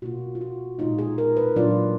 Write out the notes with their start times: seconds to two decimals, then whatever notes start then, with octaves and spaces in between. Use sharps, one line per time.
0.02 B2 A#3 F4 F#4
0.35 F4
0.41 F#4
0.79 A#2 G#3 B3 D#4 F4
0.99 G#4
1.18 A#4
1.37 B4
1.56 A#2 F#3 D4 F4 D5